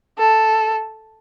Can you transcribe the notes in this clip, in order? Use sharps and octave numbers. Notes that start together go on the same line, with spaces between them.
A4